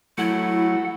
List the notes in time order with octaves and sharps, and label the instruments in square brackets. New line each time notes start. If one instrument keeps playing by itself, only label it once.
[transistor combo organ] F#3 A3 [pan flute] E4 [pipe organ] F#5